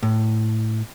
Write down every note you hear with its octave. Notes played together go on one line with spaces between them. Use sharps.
A2